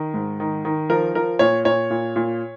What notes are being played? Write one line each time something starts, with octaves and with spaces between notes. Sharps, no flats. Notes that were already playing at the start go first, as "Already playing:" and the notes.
Already playing: D#3
G#2
D#3
D#3
F3 A#4
F3 A#4
A#2 C#5
A#2 C#5
A#2
A#2